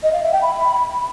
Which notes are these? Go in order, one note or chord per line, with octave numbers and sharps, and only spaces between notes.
D#5
F5
E5
G5
B5